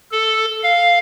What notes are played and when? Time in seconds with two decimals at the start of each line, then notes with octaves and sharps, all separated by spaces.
0.12 A4
0.63 F5